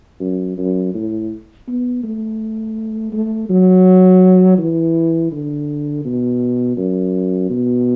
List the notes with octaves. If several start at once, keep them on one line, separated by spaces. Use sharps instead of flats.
F#2
F#2
A2
B3
A3
A3
F#3
E3
D3
B2
F#2
B2